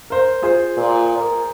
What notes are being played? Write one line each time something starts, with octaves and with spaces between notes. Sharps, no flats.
A#4 C5
F4 G#4 C5
A#2
A#4